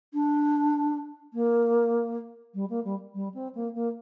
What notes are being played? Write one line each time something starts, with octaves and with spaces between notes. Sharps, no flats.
D4
A#3
G3
A#3
G3
G3
C4
A#3
A#3